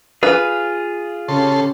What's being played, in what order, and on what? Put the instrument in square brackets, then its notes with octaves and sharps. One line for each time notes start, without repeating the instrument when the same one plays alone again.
[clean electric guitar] F4 G#4 [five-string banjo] B4
[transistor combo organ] C#3 A4 C6 [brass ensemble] C#4 G4